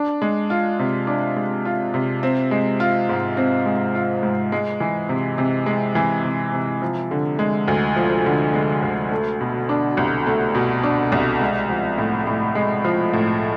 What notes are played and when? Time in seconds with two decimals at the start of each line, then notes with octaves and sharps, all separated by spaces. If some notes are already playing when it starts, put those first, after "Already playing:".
Already playing: D4
0.22 G#3
0.50 F4
0.79 C3
1.07 D4
1.36 G#3
1.65 F4
1.94 C3
2.23 C4
2.51 G#3
2.80 F4
3.09 G#2
3.37 C4
3.66 G#3
3.95 F4
4.23 G#2
4.52 G#3
4.80 E3
5.09 C3
5.38 C3
5.66 G#3
5.95 E3
6.24 C3
6.53 C3
6.82 F3
7.11 D3
7.39 G#3
7.68 D2
7.96 F3
8.26 D3
8.54 G#3
8.83 D2
9.11 A3
9.41 B2
9.69 D4
9.97 C2
10.27 A3
10.55 B2
10.83 D4
11.12 C2
11.41 G#3
11.69 F3
11.98 A2
12.27 A2
12.55 G#3
12.85 F3
13.13 A2